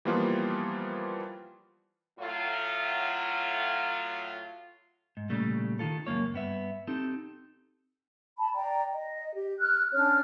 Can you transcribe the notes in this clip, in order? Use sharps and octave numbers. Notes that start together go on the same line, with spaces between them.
E3 F3 G3 A#3 B3 F4
A2 F#3 F4
G#2
A#2 C#3 G3 A3
D#3 F4 A4
C#2 F#2 B2 A#3 C#5
G2 B3 E5
C4 D#4 G4 A4
A5 B5
D5 G5 A#5
D#5
G4
F6 F#6
C#4 D4 C#5 F6